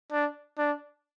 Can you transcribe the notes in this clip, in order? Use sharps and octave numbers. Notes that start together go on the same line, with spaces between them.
D4
D4